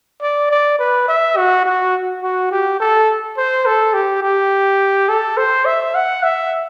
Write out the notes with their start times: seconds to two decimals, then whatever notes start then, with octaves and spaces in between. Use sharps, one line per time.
0.22 D5
0.51 D5
0.79 B4
1.08 E5
1.37 F#4
1.65 F#4
2.22 F#4
2.51 G4
2.80 A4
3.37 C5
3.66 A4
3.94 G4
4.22 G4
5.09 A4
5.37 C5
5.66 E5
5.95 F#5
6.23 E5